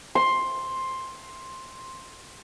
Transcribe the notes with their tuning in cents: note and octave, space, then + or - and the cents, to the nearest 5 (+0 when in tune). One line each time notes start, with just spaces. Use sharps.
C6 +10